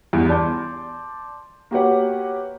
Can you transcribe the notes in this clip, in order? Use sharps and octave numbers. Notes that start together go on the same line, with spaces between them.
E2 G2
D5 A5 C6 G6
A#3 F#4 G4 B4 C#5 F#5